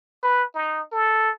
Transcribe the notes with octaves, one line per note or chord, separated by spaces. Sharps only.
B4
D#4
A4